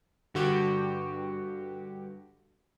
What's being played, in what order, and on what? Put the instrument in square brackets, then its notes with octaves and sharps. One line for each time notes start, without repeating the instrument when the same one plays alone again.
[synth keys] G2 D3 F#4 G4